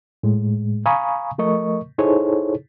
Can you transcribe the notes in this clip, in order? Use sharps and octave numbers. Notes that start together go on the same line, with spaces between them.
A2 G#3
F5 G#5 A#5 B5 C#6 D#6
F3 A3 A#4 D#5 C#6
D#4 E4 G#4 A4 C5 C#5